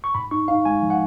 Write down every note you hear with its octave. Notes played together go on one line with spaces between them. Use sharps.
C#6
G#2 B5
D#4 C#6
D#4 F5
G#3 G#5
F3
F#5